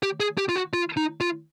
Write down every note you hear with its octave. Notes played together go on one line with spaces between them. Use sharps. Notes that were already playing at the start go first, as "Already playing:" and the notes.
G4
G#4
G4
F4
F#4
F4
D#4
F4